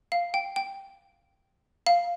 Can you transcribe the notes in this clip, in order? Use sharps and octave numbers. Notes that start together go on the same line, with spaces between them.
F5
G5
G5
F5